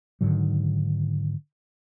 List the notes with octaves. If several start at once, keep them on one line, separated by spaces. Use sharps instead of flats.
G#2 D3 D#3 F#3